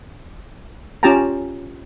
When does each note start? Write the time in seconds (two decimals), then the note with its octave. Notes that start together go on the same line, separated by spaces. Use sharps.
1.03 C#4 F4 G4 G5 A5 A#5